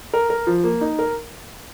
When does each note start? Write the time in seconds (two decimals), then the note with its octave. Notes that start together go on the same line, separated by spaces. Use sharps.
0.13 A#4
0.30 A#4
0.47 F3
0.64 A#3
0.81 D#4
0.99 A#4